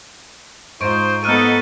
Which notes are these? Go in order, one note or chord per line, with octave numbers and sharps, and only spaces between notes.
G#2 D#4 F4 C5 C#6 D7
B3 D#4 A4 F6 F#6 D#7